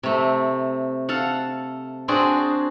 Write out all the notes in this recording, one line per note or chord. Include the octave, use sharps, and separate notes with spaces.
C3 A3
A4 F5 F#5
C4 D4 F#4 G#4 D5